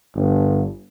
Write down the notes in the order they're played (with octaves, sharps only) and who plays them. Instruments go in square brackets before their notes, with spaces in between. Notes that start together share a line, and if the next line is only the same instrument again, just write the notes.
[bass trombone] G1